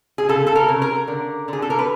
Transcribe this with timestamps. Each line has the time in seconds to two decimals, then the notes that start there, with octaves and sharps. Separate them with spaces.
0.18 G#4
0.29 C#3 A4
0.47 A4
0.55 A#4
0.68 C#3
0.82 A#4
1.08 D3
1.48 D3 G#4
1.62 A4
1.70 A#4
1.79 B4